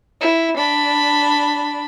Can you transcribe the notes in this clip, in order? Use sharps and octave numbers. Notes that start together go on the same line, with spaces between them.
E4
D4 B5